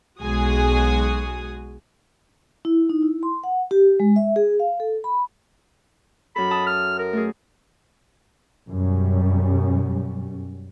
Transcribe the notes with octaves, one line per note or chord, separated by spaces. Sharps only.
B1 G#3 F#4 G#4 G#5 D#6
E4
D#4
E4
C6
F#5
G4
G#3
E5
G#4
F5
A4
B5
F#2 A4 B5
E5 A5 D#6
F6
A#4
A3 G#4
F#2 B2 G3 C#4